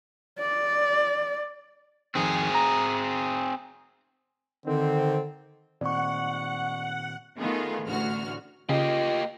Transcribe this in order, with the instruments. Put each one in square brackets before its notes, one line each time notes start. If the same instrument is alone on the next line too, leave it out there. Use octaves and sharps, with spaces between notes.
[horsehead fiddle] D5
[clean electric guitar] F2 D#3 [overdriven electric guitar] C4 G#4
[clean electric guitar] A#5
[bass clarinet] D3 [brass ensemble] D#3 C4
[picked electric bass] A#2 D#3 C4 [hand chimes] D5 C#6 [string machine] F#5
[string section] D#3 A3 B3 F4 G#4
A1 D2 F#4 F6
[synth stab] C#3 [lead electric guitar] A#3 G4 [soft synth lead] F4 [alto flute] D#5